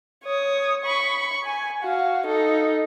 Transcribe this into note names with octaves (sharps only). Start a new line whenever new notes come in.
C#5 D#6
B5 C#6
G#5
F#4 F5
D#4 A4